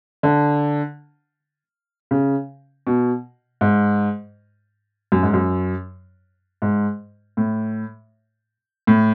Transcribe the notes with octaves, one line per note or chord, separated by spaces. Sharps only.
D3
C#3
B2
G#2
F#2
G#2
F#2
G#2
A2
A2